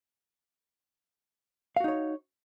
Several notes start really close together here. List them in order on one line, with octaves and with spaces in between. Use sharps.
F5 F#4 D#4 C#5